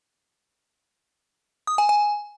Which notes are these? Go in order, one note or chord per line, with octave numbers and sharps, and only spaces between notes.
D#6
G#5
G#5